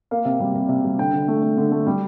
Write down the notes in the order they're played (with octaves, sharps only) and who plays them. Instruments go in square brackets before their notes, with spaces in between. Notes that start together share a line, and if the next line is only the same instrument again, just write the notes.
[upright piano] A#3 F5
C3
G3
C3
C3
G3
D3 G5
D3
A3
A3
D3
A3
G3